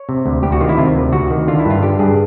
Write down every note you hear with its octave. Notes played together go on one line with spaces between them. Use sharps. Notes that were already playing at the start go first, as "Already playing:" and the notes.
Already playing: C#5
C3
D2
D2 G4
F#4
D#3 F4
E4
C3 F4
D2
D2 F#4
D#3
D3 F4
E4
G2 F4
D3 G4
G2 G#4